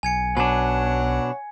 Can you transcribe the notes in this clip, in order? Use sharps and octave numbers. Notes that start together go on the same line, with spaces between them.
B1 G#5 G#6 C#7
B2 D4 C#5 F#5 G#5